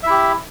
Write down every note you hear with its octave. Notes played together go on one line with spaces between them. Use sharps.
E4 G4 E5